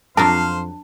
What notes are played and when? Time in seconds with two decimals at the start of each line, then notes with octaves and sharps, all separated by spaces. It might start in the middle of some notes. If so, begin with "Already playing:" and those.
0.17 F2 F#3 D4 A#4 C5 F5 A5